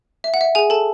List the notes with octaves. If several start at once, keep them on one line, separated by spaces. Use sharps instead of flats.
E5
F#5
E5
G#4 G#5
A4 A5